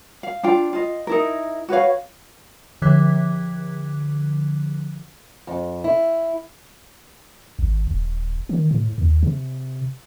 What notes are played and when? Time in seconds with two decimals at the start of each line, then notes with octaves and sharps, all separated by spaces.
0.23 F5
0.43 D4 F4 G5
0.73 F4 D#5
1.07 D#4 E4 A#4
1.69 F#4 B4 C#5 F5
2.82 D3 F3 D6 F#6 G#6 B6
5.47 F2
5.84 E4
7.59 G#1
7.87 D#1
8.49 D#3
8.71 A2
8.98 D#2
9.23 C3